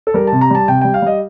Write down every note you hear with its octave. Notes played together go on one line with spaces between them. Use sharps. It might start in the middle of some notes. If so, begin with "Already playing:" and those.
A4
G3 A#4
C3 A5
A#5
G3 A5
C3 G5
G3 G5
F5
G3 D#5